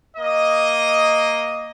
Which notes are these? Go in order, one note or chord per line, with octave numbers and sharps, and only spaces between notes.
A#3 D#5